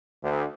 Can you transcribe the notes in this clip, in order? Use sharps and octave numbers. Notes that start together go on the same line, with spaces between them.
D2